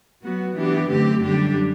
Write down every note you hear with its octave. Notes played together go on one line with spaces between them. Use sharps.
F#3 B3 F#4
E3 B3 D4 G4
F#2 D3 A3 C4 G4
F#2 D3 G3 D4 G4